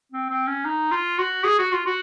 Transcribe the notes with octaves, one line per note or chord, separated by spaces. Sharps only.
C4
C4
C#4
D#4
F4
F#4
G#4
F#4
F4
F#4